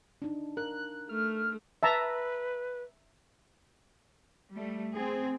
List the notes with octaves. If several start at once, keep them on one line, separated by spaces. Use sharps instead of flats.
D4 D#4
A#4 F#6
A3 F6
B4 E5 A5 A#5
G3 A3
C4 G#4